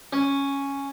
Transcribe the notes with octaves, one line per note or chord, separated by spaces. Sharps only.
C#4